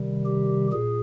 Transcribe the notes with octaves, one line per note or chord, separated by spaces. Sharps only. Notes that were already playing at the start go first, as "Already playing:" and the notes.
Already playing: C3 D#3 G3
G4
A#2 G#4